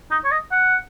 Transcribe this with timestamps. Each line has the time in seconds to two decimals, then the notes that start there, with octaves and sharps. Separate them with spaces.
0.11 D#4
0.25 C#5
0.31 D#5
0.51 F#5